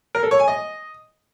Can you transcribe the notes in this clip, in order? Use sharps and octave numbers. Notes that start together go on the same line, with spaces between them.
A#4
A4
C#5
G#5
D#5